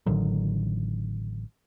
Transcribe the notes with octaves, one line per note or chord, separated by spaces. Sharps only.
A1 D3 D#3 F#3